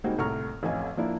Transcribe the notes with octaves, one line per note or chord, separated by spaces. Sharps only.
G3 G#3 A#3 C4 D#4 F#4
C2 A2 A#5 C#6 F6
A1 F2 C#4 D#5 F5 G#5
F3 A#3 D4 E4